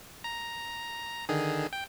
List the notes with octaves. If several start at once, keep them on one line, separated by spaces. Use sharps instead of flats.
A#5
D3 D#3 G#4
G5